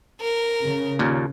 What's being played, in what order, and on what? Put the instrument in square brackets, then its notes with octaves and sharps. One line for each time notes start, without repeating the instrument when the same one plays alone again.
[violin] A#4
[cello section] C#3
[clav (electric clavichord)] D#2 A#2 A#4